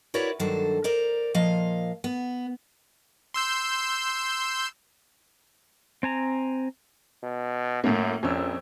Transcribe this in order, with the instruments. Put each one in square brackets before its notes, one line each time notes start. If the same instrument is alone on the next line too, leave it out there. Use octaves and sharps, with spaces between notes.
[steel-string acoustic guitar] E4 F#4 A#4 B4 C#5 D5
G2 D#3 F#3 D4 A4 C5
A#4 C5 D5 A#5
A#2 F3 D#5 F5
B3
[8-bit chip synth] C6 E6 G6
[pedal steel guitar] C4 G#5 A#5
[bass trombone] B2
[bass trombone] F#2 [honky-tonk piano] A2 A#3
[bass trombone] A#1 [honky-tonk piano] F2 C#4 E6